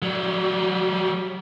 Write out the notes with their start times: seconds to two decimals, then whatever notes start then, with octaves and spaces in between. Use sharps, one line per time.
0.02 F#3 G3